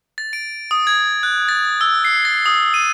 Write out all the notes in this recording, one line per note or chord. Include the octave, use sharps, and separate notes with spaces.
A6
D7
D#6
G#6
F#6
A6
E6
C7
A6
D#6
D#7